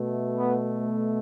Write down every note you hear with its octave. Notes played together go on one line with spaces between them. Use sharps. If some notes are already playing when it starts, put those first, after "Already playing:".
Already playing: B2 A3
B3